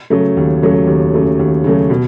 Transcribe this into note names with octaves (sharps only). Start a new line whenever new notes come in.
C#3 F#3 A3
D#2
C#3 F#3 A3
D#2
C#3 F#3 A3
D#2
C#3 F#3 A3
B2